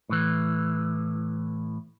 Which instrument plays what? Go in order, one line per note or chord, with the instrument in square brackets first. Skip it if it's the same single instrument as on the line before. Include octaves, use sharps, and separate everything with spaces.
[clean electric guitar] A2 E3